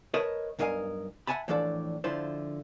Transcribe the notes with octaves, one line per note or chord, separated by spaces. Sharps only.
A#4 B4 C#5 D#5 A5
B1 G2 A#4 D#5 F5 G#5
E5 F#5 G#5 A5 B5
A2 E3 F3 D4 A4 D5
D3 F3 E4 F4 C5